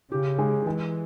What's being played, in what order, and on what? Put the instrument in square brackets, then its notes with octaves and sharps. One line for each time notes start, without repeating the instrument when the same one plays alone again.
[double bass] C#3 [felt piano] G4
[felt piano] G#3
[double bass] E3 [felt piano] G#3